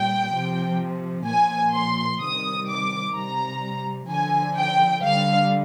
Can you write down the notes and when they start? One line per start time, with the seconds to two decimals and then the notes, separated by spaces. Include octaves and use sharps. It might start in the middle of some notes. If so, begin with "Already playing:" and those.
Already playing: A#2 G3 G5
0.32 C3 F3
1.27 A#2 F3 G#5
1.73 C6
2.21 C3 D#3 G3 D#6
2.68 D6
3.15 C3 G3 A#5
4.09 D3 F3 G#5
4.57 G5
5.03 D3 G3 F5